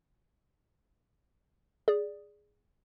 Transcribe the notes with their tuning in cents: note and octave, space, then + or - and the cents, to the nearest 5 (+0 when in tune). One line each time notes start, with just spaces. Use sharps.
G#4 +0 D5 +0